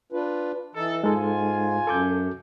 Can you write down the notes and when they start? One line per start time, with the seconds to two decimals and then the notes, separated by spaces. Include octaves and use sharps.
0.12 D4 F4 B4
0.75 E3 D#4 A4
1.04 G#2 G#3 D#4 F4 A4 G#5
1.87 F#2 A4 D6 G6